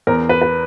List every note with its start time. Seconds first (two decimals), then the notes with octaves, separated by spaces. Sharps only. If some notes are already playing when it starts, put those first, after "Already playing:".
0.07 E2 A#4
0.29 B4
0.42 B4